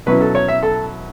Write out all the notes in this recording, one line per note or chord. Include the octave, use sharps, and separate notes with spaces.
B2 F#3 C#4 E4 B4
A4
C#5
E5
A4